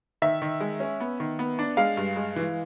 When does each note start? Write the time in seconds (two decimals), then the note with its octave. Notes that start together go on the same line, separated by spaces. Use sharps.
0.22 D#3 E5
0.42 D#3
0.60 G#3
0.80 C#4
1.00 B3
1.20 D#3
1.39 B3
1.59 D4
1.77 G#3 F5
1.97 G2
2.16 G#3
2.36 E3